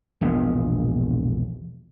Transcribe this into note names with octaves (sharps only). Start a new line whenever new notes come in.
E1 A#1 A#2 B3